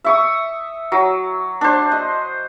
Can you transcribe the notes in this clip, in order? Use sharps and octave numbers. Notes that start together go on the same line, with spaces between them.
E5 C#6 D#6
F#3
D4 C5
D#5